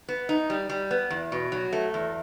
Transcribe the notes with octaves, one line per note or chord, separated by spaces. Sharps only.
B3
D#4
G3
G3
B3
E2
B2
F#3
A3
E2